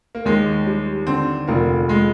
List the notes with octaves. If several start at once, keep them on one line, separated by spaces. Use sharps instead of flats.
A#3
D#2 G#3
G3
D3 C4
F1 A#3
G#3